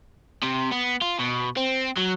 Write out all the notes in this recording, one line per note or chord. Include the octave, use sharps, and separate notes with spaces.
C3
B3
F4
B2
C4
F#3